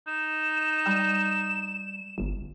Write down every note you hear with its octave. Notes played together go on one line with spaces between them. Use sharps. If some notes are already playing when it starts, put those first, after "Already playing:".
D#4 E7
G3
G1